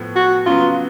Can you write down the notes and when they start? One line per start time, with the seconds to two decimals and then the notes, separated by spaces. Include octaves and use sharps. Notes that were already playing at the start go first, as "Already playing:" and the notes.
Already playing: A2 F3 B3
0.16 F#4
0.46 C#3 F#3 B3 F4